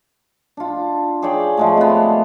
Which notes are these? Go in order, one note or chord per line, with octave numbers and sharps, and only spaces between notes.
D4 F4
G#4 C#5 D5 G5
F3 G#3 A3
C3 B3